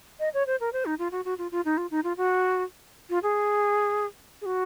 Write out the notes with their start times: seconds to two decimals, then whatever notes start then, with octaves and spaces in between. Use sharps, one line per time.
0.20 D#5
0.34 C#5
0.47 C5
0.60 A#4
0.73 C5
0.86 D#4
0.99 F4
1.12 F#4
1.25 F#4
1.38 F4
1.52 F4
1.65 D#4
1.77 F4
1.91 D#4
2.04 F4
2.17 F#4
3.10 F4
3.23 G#4
4.42 G#4
4.46 F#4